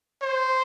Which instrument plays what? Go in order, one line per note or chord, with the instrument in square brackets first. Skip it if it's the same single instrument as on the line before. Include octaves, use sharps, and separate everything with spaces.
[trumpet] C5